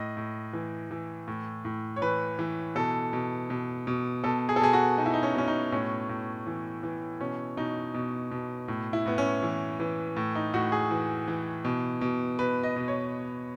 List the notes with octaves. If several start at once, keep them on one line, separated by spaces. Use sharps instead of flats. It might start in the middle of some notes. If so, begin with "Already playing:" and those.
Already playing: A2 D#5
A2
E3
E3
A2
A2
C#5
E3 B4
E3
B2 A4
B2
B2
B2
B2 A4
G#4
A4
B2 G#4
F#4
B2 D#4
E4
D#4
C#4
B2 C#4
D#4
A2 C#4
A2
E3
E3
B2 C#4
B2 D#4
B2
B2
A2
E4
A2 B3
C#4
E3
E3
A2
D#4
A2 F#4
G#4
E3
E3
B2
B2
B2 B4
D#5
B2
C#5